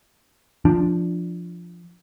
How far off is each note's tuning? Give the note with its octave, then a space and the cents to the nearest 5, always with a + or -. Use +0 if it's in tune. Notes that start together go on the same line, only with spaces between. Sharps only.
F3 -5 D4 +0